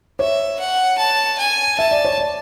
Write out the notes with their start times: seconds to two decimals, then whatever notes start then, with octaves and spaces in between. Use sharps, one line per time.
0.19 C#5 E5
0.60 F#5
0.98 A5
1.39 G#5
1.79 E5 A5
1.91 D5
2.05 C#5
2.18 D5